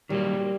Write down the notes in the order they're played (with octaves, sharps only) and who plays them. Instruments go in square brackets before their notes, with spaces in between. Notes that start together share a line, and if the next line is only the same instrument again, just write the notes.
[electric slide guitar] D#3 F#3 A#3 [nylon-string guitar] G3